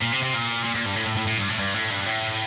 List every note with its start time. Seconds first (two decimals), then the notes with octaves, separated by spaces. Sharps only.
0.01 A#2
0.12 C3
0.23 C3
0.33 A#2
0.65 A#2
0.75 A#2
0.86 G2
0.96 A2
1.06 A2
1.17 A2
1.27 A2
1.38 G2
1.49 A2
1.59 G2
1.74 A2
1.90 G2
2.06 A2